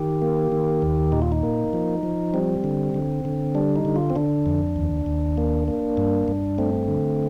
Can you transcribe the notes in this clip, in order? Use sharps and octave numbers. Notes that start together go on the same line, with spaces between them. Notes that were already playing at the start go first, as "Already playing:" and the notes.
Already playing: D#3 G4
A#3
D#3
D#2
A#2 D#4
F4
D#4
A#3
F3
F3
G3 C4
D3
D3
D3
G3 D4
D#4
D3
F4
C4
D3 D4
F2
D#2
D#2
A#3
A#3
G2
G2
A3 C4
D3